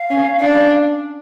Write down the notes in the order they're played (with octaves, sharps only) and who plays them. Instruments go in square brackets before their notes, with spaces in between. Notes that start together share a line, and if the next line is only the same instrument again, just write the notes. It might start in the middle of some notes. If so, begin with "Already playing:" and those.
Already playing: [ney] F5
[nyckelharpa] C#4
D4